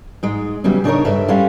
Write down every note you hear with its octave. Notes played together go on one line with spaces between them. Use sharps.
G#2 G#3
E2 C#3 F#3 G3 C#4
C#3 D4 D#4 A4 A#4 C#5
G2 A4 E5
G3 G#3 C#4 A4 F5